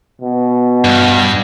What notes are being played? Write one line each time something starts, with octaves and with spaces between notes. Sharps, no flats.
B2
G2